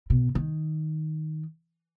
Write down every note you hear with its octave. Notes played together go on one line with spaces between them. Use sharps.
B2
D#3